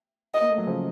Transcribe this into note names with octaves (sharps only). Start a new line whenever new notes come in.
D#5
A#3
A3
F#3
C#3 F3